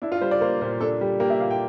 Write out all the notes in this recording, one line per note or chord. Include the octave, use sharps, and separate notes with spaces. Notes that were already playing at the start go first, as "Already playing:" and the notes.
D4 E4
F4
G3 C5
D5
A#3 C5
A#2 C5
D4 A4
G3 G4
A#3 G4
E5
A#2 F5
G5